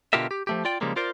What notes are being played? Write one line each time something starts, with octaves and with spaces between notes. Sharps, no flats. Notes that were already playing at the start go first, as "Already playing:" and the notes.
B2 D3 F4 G4 A#4 E5
G4
F3 A3 G4
F4 D5 G5
C#3 F3 G3 G#3 A#3
F4 A#4 C5 D5